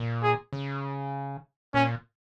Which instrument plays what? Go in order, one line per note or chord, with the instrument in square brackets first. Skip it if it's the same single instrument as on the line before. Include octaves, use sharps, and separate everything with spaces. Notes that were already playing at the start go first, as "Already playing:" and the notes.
Already playing: [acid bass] A#2
[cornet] G#4
[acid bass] C#3
[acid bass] A#2 [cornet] C#4